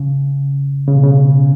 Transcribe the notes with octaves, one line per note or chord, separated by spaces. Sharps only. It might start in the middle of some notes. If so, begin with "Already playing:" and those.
Already playing: C#3
C#3
B2
C#3